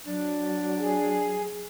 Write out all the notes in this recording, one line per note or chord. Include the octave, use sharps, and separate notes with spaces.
F#3 D4
G#4